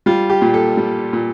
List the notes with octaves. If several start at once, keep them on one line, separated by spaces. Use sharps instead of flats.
G3 F4
G4
A#2
A4
G3
A#2